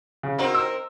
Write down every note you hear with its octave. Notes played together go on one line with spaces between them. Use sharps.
C#3
C4 D#4 F#4 A#4
E6